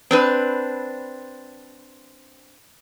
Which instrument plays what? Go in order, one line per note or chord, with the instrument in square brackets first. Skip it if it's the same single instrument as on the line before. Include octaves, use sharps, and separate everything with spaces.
[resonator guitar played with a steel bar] C4 D4 B4